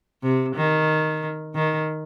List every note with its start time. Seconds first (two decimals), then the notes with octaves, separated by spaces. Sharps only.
0.23 C3
0.55 D#3
1.55 D#3